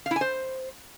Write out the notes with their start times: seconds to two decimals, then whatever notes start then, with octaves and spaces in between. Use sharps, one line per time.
0.06 F5
0.11 E4
0.16 G#5
0.21 C5